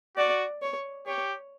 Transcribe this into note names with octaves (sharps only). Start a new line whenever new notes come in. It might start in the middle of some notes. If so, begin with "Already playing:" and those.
F#4 D5
C#5
G4 C#5